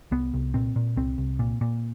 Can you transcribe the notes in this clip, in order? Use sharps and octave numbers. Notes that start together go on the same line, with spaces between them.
C2 B3
C2
A#2 C4
A#2
C2 C4
C2
A#2
A#2